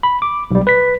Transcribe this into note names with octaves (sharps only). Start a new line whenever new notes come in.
B5
D6
B1 G3
B4 B6